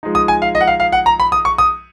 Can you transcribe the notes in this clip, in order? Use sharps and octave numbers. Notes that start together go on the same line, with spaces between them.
F3 G#3 D#4
D#6
G#5
F5
D#5
F#5
F5
F5
F#5
A#5
B5
D#6
C#6
D#6